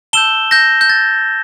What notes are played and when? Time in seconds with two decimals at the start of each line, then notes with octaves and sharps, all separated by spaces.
0.13 A5 E6 G6 E7 G7
0.51 G6 A#6
0.81 G6
0.90 A6